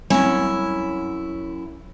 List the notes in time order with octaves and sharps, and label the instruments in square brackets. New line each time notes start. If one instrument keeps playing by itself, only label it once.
[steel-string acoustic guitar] F#2 E4 [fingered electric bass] G3 A3 C4 [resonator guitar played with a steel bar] C#4